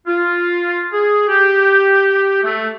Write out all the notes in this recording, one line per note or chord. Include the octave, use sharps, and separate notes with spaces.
F4
G#4
G4
A3